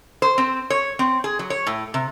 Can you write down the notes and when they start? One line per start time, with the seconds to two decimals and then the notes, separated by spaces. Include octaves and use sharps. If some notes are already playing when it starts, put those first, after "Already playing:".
0.22 C5
0.38 C4
0.70 C#5
0.99 C4
1.24 G#4
1.39 F#3
1.50 C#5
1.67 A2
1.94 C3